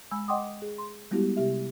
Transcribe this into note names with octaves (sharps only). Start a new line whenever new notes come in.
G#3 G#5 B5 E6
D#5 F#5 G5 C6 D6 D#6
G#4
C6
G3 G#3 B3 E4 F#4 G4
C3 G4 E5